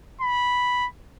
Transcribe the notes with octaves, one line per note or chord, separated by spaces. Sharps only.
B5